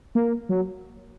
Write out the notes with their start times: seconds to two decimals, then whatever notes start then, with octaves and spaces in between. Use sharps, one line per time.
0.15 A#3
0.49 F#3